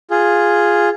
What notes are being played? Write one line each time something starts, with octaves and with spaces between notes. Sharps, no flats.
F4 G#4